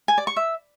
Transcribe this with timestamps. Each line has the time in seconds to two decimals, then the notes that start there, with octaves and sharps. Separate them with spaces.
0.08 G#5
0.18 D5
0.27 C#6
0.37 E5